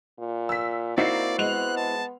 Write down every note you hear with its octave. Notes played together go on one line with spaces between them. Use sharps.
A#2
E6 B6
A#3 C4 D#4 E4 F#4 D5 C7
G#3 B3 F#6 F7
A5